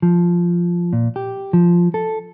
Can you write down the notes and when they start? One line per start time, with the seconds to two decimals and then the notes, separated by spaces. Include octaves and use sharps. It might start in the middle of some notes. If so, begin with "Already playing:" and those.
0.02 F3
0.93 A#2
1.16 G4
1.53 F3
1.94 A4